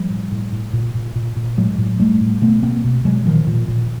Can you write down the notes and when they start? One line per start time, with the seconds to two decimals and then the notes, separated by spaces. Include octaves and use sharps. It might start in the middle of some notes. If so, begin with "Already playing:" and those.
Already playing: F3 G3
0.10 A2
0.32 A2
0.52 A2
0.73 A#2
0.95 A#2
1.16 A#2
1.36 A#2
1.58 A2 F#3 G#3
1.78 A2
2.00 A2 G3 A3
2.21 A2
2.42 B2 A3 B3
2.63 B2 A#3 C4
2.84 B2
3.05 B2 F#3 G#3
3.26 A#2 D#3 F3
3.47 A#2
3.68 A#2